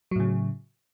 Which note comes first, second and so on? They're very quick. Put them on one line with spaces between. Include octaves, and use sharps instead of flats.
F#3 A2 C#3